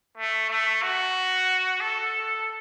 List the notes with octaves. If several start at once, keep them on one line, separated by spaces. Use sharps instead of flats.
A3
A3
F#4
A4